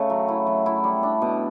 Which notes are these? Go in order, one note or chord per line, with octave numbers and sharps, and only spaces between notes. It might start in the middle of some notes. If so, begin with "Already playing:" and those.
Already playing: C#3 A3
F#3
E4
F#3
E4
G3
D4
B2